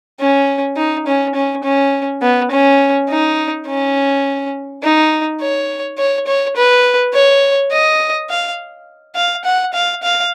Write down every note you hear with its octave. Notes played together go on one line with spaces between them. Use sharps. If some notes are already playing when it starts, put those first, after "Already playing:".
C#4
D#4
C#4
C#4
C#4
B3
C#4
D#4
C#4
D#4
C#5
C#5
C#5
B4
C#5
D#5
F5
F5
F#5
F5
F5